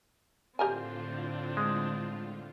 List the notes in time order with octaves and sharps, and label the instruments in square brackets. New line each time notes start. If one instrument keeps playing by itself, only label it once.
[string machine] A2 D3 F4 [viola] C4 D4 [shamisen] G4 A#4 G#5
[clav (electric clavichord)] G#3